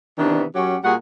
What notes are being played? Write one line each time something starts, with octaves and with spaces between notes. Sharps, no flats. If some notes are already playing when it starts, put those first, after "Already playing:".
C3 D#3 E3 B3 D4
F#2 F#3 C#4 G4 C#5 F#5
A#2 G3 F#4 G#4 F#5